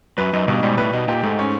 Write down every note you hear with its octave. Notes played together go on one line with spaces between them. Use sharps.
F#2 B4
F#2 D#4
G2 B2
G#2 G3
A2 B4
B2 D#4
A#2 G4
G#2 A3
C#4